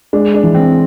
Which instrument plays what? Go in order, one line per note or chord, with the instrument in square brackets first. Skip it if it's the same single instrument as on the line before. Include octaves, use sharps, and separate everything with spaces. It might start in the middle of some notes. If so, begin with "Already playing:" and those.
[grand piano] G#3 [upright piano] D4
[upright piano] D4
[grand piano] E3
[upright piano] C4